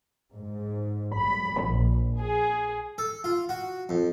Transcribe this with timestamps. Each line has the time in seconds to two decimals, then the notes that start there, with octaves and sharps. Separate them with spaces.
0.33 G#2
1.16 B5
1.63 A#1
2.19 G#4
2.98 A4
3.24 F4
3.49 F#4
3.89 F2